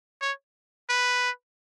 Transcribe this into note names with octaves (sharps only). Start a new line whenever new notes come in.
C#5
B4